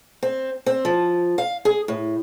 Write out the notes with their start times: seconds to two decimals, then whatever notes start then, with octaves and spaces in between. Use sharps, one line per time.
0.23 C4
0.66 C4
0.85 F3
1.38 F5
1.65 G#4
1.88 A2